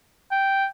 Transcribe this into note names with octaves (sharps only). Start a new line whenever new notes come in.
G5